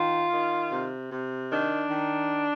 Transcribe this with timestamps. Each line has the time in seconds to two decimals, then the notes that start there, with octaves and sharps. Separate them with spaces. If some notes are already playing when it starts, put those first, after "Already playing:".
Already playing: D#3 F4
0.32 D#3
0.72 C3
1.11 C3
1.51 D#3 D4
1.90 D#3